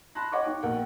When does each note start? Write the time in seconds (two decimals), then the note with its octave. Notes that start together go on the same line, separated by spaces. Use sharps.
0.15 A5 B5 C6 F#6 A#6
0.32 C#5 D#5 F#5 G5 C#6 D6
0.46 D#4
0.63 A#1 B2 A#4 F#5 G5